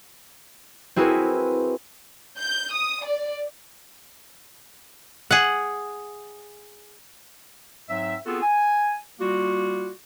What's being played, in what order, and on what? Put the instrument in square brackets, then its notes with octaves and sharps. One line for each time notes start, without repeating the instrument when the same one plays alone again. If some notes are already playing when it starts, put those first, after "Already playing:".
[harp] C4 E4 F#4 G#4 A#4 B4
[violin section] G6
D#6
D5
[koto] G#4 F#5
[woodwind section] G#2 F#3 C4 E5
B3 C4 F4 F#4 G#4 A4
G#5
G3 A#3 F4 F#4